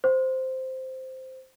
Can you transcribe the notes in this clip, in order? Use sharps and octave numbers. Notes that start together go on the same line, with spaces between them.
C5